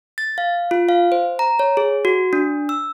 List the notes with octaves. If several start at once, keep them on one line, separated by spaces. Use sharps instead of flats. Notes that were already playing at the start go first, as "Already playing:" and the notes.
A6
F5
F4
F5
C5
A#5
C#5
G#4
F#4
D4
E6